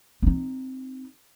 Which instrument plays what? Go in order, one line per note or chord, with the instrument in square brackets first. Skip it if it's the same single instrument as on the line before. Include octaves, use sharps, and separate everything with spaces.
[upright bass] C4 D#4